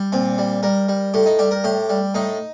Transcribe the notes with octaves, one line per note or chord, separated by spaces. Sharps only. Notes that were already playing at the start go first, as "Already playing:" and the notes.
Already playing: G3
A#2 C4
G3
G3 A#4
G3
A2 G4
D#4
G3 G4
A#4
A2 G4
G3
A2 D#4